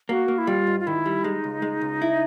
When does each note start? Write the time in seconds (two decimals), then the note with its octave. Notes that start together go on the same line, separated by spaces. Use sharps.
0.09 A#3 F#4
0.28 A#3
0.38 E4
0.47 G3 F4
0.67 G#2
0.80 F4
0.87 D#3 E4
1.06 G3
1.24 G#3 D#4
1.44 C#2
1.62 G#3
1.81 C#2
2.02 E4